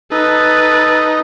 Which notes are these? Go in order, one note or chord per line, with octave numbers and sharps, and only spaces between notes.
D#4 A4 B4